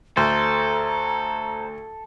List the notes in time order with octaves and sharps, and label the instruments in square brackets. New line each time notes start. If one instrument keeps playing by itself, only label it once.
[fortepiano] D2 [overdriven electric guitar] A4 [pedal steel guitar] C5 [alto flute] A#5